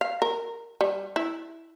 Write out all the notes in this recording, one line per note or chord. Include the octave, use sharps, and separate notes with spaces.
F5
A#4
G3
E4